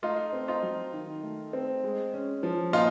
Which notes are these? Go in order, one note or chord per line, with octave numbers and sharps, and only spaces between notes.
A3 D#4 F4
C4
D#4 F4
F#3
D#3
A3
C4
G#3
C#4
F3
A#2 D#4 F4